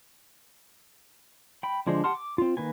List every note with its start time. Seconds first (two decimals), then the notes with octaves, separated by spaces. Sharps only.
1.63 G5 B5
1.87 D3 F3 G#3 D4 C5
2.04 G4 F#5 A5 C6 F6
2.15 D6
2.38 C4 F4
2.57 D#3 A#3 B4 G#5